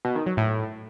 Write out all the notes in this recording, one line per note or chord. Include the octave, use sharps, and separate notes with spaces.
B2
D#3
F#3
A2